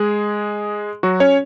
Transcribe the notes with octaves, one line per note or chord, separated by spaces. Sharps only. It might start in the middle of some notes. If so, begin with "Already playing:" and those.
Already playing: G#3 G#4
F#3 F#4
C#4 C#5